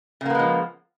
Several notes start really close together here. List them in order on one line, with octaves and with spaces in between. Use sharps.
C#3 A#3 B3 G#3 F3